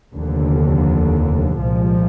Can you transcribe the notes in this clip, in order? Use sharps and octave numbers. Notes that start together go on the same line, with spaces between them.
F1 D#2 D3
C2 A#2 F3 G#3